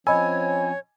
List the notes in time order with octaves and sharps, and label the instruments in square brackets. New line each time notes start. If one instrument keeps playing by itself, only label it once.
[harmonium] F3 C4 C#4 [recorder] C#5 [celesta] D#5 B5 E6 [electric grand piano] G#5